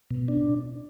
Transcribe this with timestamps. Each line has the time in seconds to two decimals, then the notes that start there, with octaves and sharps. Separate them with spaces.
0.11 B2
0.28 D4